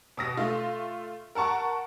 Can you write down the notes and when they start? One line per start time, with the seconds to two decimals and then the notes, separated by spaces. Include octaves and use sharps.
0.17 B2 D#6 A#6
0.37 A3 F4
1.35 A#4 F#5 A5 C#6